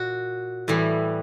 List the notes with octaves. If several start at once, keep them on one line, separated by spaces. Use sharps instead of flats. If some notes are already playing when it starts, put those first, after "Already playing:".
Already playing: A#2 F#4
A2 E3 G3